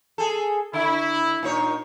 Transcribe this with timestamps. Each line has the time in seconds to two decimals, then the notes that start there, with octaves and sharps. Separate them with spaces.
0.18 G#4 A4
0.73 D3 E4
1.43 A#2 D#4 C#5